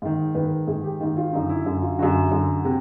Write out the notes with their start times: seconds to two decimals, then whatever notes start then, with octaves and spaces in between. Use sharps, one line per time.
0.02 G#2 D#3
0.34 G#2 D#3 B4
0.46 A#4
0.67 G#2 D#3 G#4
0.84 G4
1.00 G#2 D#3
1.17 F4
1.33 F#2 D3 D#4
1.49 E4
1.66 F#2 D3
1.82 F4
1.99 F#2 D3 F#4
2.32 F#2 D3
2.65 C3